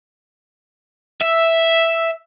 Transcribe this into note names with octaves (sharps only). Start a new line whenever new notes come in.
E5